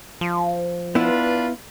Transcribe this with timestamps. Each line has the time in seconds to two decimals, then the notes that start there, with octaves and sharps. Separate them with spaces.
0.21 F3
0.95 B3 D4 E4 F4 B4